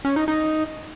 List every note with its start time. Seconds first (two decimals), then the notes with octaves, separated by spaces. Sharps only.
0.05 C#4
0.16 D#4
0.28 D#4